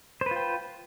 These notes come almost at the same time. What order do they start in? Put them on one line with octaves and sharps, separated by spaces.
C5 B4 F4 G5